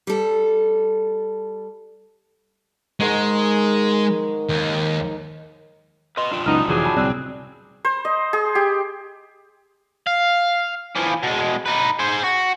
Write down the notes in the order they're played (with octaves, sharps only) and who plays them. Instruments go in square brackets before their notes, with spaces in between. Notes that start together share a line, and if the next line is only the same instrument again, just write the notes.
[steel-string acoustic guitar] G3 A4
[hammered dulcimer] G#2 D#3 [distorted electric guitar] G#3
[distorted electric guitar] D#2
[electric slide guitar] B4 D#5 [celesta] C6
[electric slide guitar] D4 F4 G5
[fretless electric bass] C#2 F#2 [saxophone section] B3 D#4 [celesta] F6
[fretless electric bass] F1 D2 E3 [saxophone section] F#3 G4 G#4
[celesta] G#5 A5 B5
[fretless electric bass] D1 C2 [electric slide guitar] C4 [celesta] D5 F#6
[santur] C5
D#5
G#4
G4
[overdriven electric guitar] F5
E3 F3
B2 G#3
D#4 B4
G#4 C5
F#4